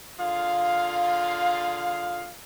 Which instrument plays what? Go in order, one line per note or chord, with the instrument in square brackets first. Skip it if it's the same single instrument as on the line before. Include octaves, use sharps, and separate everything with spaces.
[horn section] D3 F4 G#4 F5